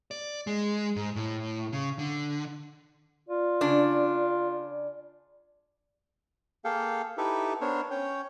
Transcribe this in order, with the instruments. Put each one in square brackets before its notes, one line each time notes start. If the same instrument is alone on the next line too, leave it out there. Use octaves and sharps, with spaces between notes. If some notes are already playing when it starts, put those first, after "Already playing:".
[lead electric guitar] D5
G#3
G#2
A2
C#3
D3
[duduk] F4 [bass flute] D5
[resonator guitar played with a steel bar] C#3 D4
[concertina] A#3 G#4 A4 F5 G5
D#4 E4 G4 A4 B4 E5
B3 D4 A#4 C5 C#5
C#4 C#5 G5